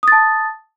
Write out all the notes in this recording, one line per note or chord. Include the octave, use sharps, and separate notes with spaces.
A5 D#6 A6